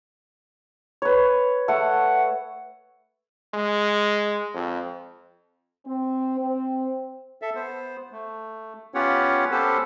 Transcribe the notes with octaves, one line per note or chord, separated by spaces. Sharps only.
B4 C#5
A3 F#5
G#3
F2
C4
C4
A4 E5
B3 C5
A3
B3 C#4 F4 G4 C#5 F#5
B3 C#4 G4 A4 B4 C5